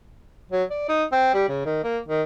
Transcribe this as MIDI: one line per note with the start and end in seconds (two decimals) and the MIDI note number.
0.52 0.64 54
0.70 0.84 74
0.89 1.04 63
1.12 1.32 60
1.34 1.48 55
1.48 1.62 49
1.65 1.81 51
1.84 1.98 58
2.08 2.23 51